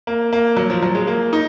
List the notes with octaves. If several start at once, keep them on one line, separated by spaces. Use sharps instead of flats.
A#3
A#3
F#3
F3
F#3
G#3
A#3
D#4